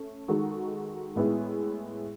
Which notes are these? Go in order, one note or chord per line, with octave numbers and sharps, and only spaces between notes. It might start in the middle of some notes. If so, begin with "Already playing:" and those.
Already playing: A3 C#4
D#3 G#3 D#4 F#4 A4
A2 G#3 B3 E4 G#4